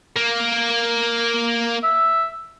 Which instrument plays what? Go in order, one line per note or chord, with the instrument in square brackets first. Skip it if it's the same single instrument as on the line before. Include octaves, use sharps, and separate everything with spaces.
[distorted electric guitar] A#3
[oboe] E5